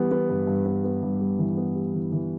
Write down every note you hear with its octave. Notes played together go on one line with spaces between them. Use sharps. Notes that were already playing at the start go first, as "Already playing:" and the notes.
Already playing: E3 G3 B3 G4
B3
G2 B4
G2
B3
B3
G2
G3
E3
B3
G3
E3
E3